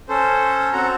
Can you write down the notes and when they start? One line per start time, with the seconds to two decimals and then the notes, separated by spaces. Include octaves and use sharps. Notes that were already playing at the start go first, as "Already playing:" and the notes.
0.09 C#4 A4 C5
0.73 C4 F#4 A4 F#5 A#5